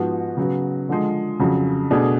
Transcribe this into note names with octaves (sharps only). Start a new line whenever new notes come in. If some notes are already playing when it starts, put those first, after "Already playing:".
Already playing: G#2 F3 B3 F#4
C#3 F#3 B3
D3 F3 G#3
F2 C#3 F#3
B2 A3 D4 G#4